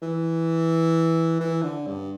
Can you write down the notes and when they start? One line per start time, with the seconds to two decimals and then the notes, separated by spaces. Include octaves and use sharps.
0.02 E3
1.40 E3
1.63 D3
1.87 G2